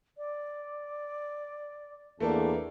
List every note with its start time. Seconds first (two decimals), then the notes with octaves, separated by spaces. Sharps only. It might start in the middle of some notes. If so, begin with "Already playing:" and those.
0.18 D5
2.20 E2 A3 A#3 D4 A5